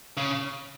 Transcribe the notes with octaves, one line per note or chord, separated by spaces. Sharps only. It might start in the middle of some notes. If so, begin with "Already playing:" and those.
C#3